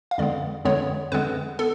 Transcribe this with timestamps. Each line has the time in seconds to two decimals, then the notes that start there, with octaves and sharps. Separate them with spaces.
0.11 F5
0.18 F2 D3 G#3 B3 D5
0.65 F2 D3 G#3 B3 C#5
1.12 F2 D3 G#3 B3 B4
1.59 B3 A4